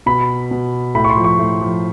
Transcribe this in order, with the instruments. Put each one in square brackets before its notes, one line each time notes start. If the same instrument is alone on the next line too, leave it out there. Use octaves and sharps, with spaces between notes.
[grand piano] B2 B5
B2
A2 B5
C#6
C6
F3
C#6
A2
F3